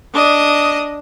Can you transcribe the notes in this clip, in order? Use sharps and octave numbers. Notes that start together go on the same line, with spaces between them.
D4 D#5